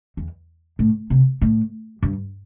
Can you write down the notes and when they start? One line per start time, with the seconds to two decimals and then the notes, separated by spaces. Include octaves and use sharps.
0.17 E2
0.79 A2
1.10 C3
1.41 A2
2.03 G2